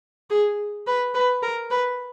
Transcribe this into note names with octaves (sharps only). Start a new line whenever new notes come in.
G#4
B4
B4
A#4
B4